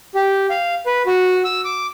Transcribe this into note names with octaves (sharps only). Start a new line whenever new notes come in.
G4
F5
B4
F#4
E6
D6